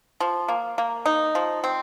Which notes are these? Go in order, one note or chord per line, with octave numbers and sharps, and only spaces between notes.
F3
A#3
A#3
D#4
F3
C4